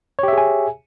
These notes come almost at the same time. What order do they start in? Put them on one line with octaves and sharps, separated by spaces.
C#5 G4 E5 G#4 G#5